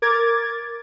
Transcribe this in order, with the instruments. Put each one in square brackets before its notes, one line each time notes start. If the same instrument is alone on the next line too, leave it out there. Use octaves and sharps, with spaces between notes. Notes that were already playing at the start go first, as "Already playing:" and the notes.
[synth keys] A#4 D6 G#6 A6